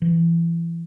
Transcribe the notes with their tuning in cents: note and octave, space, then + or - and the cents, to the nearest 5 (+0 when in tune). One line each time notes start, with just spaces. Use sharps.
E3 +30